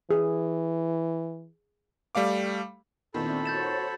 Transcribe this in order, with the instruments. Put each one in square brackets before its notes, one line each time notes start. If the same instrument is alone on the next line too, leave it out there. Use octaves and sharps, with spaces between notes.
[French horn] E3 [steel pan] G#4
[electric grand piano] G3 A3 F5 D6
[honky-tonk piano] A#2 D#3 B3 [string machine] C4 D4 E4 [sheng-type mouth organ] A4 B5
[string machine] F#4 C5 C#5 [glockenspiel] G6 A6 E7